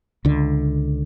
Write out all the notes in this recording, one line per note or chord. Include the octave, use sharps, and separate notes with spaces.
C#2 D3